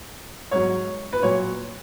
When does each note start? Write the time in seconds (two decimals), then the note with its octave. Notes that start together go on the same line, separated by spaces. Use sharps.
0.51 G#2 F#3 C#5
1.13 B4
1.22 A#2 F#3 C#5